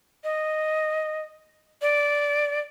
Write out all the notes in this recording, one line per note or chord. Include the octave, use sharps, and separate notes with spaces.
D#5
D5